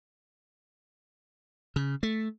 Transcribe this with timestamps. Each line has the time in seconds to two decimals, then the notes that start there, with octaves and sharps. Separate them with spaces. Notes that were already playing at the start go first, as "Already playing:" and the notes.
1.76 C#3
2.03 A3